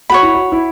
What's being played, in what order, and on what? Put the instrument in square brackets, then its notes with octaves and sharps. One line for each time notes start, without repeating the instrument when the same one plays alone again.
[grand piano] F#4 [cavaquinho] C#5 F#5 B5
[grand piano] E4
F#4
E4